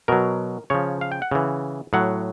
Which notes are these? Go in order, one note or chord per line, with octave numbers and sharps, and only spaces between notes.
B2 F#3 A#4
C#3 F3 C#5
F5
G5
F#5
C#3 E3
A2 F#3 F#5